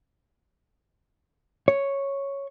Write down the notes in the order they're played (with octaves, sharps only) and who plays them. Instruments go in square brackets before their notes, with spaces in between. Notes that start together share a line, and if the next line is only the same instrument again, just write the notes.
[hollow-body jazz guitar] C#5